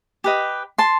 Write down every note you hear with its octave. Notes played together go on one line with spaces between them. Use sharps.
G4 B4 D#5
A5 C6